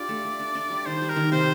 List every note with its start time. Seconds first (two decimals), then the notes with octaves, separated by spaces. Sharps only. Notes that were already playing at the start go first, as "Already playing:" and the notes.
Already playing: D4 F4 G4 D5
0.09 A3
0.25 A3
0.39 D4
0.55 D4
0.70 G3
0.86 D#3 C5
1.02 G3
1.09 A#4
1.16 D#3
1.32 C3 C5